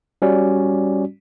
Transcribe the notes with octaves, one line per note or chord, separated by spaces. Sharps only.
G3 C#4 F#4 D5